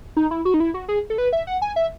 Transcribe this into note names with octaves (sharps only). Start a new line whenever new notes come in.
D#4
E4
F#4
D#4
E4
F#4
G#4
A4
B4
E5
F#5
G#5
E5